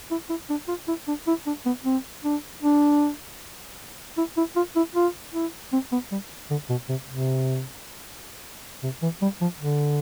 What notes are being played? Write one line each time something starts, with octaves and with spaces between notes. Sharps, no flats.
E4
E4
D4
F4
E4
D4
E4
D4
B3
C4
D4
D4
E4
E4
F4
E4
F4
E4
C4
B3
G3
D3
B2
C3
C3
C3
E3
G3
F3
D3